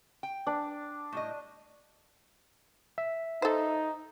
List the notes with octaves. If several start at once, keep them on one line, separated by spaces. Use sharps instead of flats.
G5
D4
A2 G3 D#5
E5
D#4 A4 C5